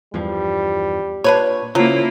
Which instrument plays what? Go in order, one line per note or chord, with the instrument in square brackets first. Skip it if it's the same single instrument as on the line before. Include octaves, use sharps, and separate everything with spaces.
[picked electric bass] E2 G2 F3 [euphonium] G3
[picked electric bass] A#2 [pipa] D4 B4 C#5
[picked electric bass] C#3 [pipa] F3 F#3 [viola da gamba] A#3 E4 F4